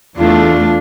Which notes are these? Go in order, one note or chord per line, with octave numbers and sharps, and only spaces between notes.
E2 A3 D4 F4